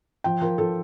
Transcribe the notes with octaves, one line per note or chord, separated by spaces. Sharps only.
F3 G5
F3 A#4
F3 A4